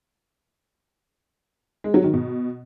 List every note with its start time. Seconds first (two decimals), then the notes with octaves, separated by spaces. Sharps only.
1.84 G#3
1.94 F#3
2.04 D#3
2.14 B2